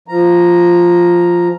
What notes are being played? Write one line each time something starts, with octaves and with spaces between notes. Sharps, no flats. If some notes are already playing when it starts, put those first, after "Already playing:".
F3 A#5